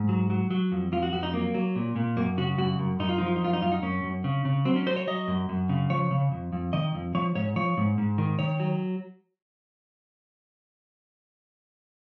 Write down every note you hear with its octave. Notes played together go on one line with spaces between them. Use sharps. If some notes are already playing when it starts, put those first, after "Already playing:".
Already playing: G#2
F#3
F#3
F#3
F2
F2 F4
F#4
F2 F#4
D#4
F#3 A#3
F#3
A#2
A#2
F#2 A#3
C#3 F#4
F#2 F#4
F#2
F#2 D#4
F4
F3 D#4
F4
D#4
F#2 F4
D#4
F#2 F4
D#4
F#2 C#4
F#2
C#3
C#3
F#3 C4
C#4
F#3 C5
C#5
F#3 D#5
F#2
F#2
C#3
F3 C#5
C#3
F2
F2
D#3 D#5
F2
F3 C#5
G#2 C#5
F3 C#5
G#2
G#2
D#3
D#3 C#5
F#3